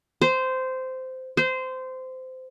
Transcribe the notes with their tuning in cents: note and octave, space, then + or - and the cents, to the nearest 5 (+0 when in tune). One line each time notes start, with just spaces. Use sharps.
C5 -15
C5 -20